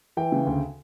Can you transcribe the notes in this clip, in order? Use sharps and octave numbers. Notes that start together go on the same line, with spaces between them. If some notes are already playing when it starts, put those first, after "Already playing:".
E3 G5
C#3
D2